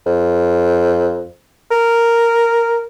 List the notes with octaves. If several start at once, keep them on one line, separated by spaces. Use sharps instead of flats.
F2
A#4